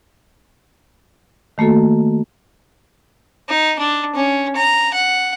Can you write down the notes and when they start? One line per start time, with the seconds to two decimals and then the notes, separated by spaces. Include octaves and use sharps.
1.58 D#3 A3 A#3 F#4 A4
3.49 D#4
3.79 D4
4.15 C#4
4.56 A#5
4.94 F#5